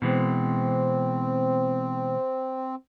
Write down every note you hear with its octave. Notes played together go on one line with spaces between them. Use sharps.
B2 E3 G#3 C4